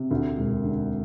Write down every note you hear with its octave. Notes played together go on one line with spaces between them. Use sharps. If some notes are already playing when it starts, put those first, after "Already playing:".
Already playing: C3
D2
E1
D3